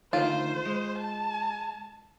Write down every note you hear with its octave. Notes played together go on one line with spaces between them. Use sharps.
D3 D#3 A3 F4 C5
G#3
A5